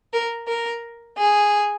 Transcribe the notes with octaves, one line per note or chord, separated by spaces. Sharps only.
A#4
A#4
G#4